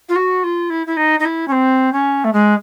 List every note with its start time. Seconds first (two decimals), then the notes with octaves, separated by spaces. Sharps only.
0.09 F4
0.15 F#4
0.43 F4
0.70 E4
0.86 E4
0.96 D#4
1.19 D#4
1.25 E4
1.47 C#4
1.52 C4
1.92 C#4
2.24 A3
2.33 G#3